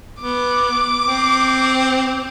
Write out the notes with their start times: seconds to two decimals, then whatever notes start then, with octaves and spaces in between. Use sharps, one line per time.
0.21 B3 D6
1.04 C4